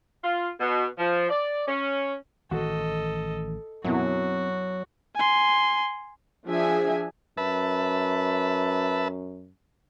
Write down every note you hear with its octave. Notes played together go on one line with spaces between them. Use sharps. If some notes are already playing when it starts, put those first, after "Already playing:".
F4
B2
F3
D5
C#4
A1 D#3 E3 F#4 A4 D#5
F#2 B2 E3 F#3 C4 F#4
G#5 C6
F3 D4 G#4 E5 G#5
F#2 B4 E5 A5